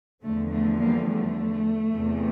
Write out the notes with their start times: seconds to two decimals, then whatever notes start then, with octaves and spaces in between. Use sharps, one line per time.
0.23 E2 D3 F3 A3
0.52 A3
0.80 G3 A#3
1.08 A3
1.93 E2 C3 E3